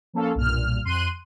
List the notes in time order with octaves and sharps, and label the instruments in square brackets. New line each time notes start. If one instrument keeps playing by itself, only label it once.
[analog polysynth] F3 A#3 C#4 A4 F5
B1 G2 A#2 F6
F2 C6 F#6 D#7